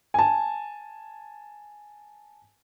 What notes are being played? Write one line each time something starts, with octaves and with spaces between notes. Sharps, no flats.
G#5 A5